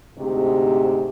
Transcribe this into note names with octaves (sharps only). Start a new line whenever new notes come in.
D2 G#2 C3 G4